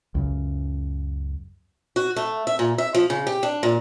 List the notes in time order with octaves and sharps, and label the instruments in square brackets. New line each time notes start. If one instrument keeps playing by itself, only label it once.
[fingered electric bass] C#2 F#2 C#3
[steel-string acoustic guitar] F#4
A3
E5
A#2
E5
F3
C#3
G4
D4
A#2